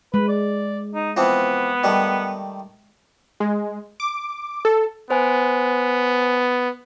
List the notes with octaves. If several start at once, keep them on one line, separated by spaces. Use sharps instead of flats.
G#3 B4
D5
D#4
E3 F3 B3 C4
D#3 G3 A3
G#3
D6
A4
B3 C5 G#5